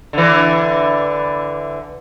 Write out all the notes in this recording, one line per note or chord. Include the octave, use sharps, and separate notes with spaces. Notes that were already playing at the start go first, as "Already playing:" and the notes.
D3 E3